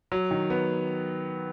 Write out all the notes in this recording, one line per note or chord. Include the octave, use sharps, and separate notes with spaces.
F#3
D#3
B3